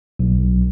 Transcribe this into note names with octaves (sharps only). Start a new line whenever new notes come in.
B1